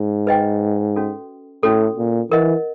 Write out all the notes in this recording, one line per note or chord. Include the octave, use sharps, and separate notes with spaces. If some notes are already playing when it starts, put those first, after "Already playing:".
Already playing: G#2
B4 D#5 G5
C#4 F#4 A4
A2 C#4 F#4 A4
A#2
E3 A#4 D#5 F#5